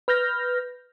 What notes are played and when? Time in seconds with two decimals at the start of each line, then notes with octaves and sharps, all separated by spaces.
0.08 B4 F6 G6 A#6